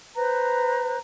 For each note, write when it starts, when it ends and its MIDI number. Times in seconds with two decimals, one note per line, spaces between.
0.16 0.97 71
0.16 0.97 72
0.16 0.97 82
0.16 0.97 90